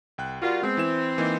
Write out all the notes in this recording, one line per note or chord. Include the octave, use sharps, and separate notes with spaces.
C2 G5 F#6
G3 F4 F#4 A#4 F#5
G#3 B3 C4
E3 E4 E7
E3 A#3 D#4